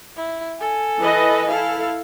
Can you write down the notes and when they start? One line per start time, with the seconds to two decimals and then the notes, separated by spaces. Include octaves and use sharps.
0.16 E4
0.60 A4 G#5
0.98 E3 B4 D#5
1.49 E4 A4 F5